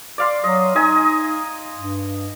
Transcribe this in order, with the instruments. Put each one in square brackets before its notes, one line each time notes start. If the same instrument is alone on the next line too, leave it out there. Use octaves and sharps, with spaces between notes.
[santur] D5 F5 C6
[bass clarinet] F#3 [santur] D#5
[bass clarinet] D#4 [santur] D#5 G#5
[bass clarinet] G2